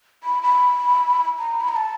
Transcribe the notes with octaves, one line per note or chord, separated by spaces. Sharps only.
B5
B5
A#5
B5
A#5
A5